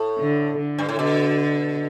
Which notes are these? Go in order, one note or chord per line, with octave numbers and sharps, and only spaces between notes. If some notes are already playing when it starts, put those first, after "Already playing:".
Already playing: A2
D3
D3
G2
A2
B2 D3